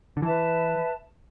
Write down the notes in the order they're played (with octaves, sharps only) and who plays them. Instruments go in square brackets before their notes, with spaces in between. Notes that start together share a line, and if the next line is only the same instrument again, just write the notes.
[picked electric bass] D3
[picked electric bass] E3 [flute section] B4 E5 A5